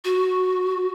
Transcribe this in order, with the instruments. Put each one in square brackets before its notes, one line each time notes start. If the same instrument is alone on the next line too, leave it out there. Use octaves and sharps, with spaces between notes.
[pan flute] F#4